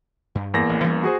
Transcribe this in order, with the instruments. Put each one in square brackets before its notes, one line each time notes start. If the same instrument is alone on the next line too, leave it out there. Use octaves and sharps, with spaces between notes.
[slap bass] G2
[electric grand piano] E2 A#3 A#6
[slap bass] A1
E3 G3 C#4
[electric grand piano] F#4 G#4 C5